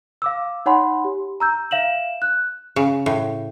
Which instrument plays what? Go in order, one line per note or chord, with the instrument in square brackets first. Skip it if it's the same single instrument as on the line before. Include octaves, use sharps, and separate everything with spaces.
[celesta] F5 D6 E6
D#4 C#5 F#5 G#5 B5 C6
G4
A#5 E6 G6
E5 F5 E7 F#7
F#6
[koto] C#3
A2